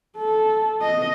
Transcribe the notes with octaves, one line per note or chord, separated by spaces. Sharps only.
A4
D#5